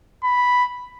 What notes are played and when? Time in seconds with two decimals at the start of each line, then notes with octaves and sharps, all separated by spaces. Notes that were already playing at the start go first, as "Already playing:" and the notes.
0.24 B5